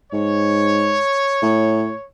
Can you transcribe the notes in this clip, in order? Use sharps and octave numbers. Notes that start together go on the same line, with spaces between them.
G#2 C#5
A2